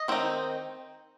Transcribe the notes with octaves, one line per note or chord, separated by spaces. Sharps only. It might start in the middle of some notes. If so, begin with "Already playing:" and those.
Already playing: D#5
D#3 C4 D#4